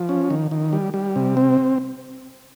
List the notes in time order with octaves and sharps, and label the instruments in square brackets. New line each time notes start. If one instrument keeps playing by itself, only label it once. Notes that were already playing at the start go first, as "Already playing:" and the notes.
Already playing: [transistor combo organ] F3
C#4
D#3
D#3
G3
G3
C3
C4